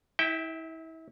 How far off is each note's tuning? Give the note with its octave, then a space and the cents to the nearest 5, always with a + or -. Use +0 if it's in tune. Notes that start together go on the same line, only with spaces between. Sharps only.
E4 -35 E5 +0 G5 +0